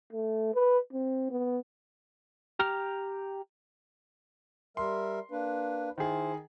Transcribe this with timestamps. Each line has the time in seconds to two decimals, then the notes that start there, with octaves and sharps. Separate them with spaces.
0.13 A3
0.55 B4
0.93 C4
1.31 B3
2.59 G4 A#5 F6
4.77 G3 A#4 E5 C6
5.31 A#3 D4 B4
5.98 D#3 E4 G#4 C5